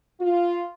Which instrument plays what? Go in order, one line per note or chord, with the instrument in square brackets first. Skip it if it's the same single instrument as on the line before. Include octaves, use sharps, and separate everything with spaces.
[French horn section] F4